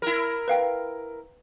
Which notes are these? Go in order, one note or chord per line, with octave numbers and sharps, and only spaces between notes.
E4 A#4
B4 F5 G5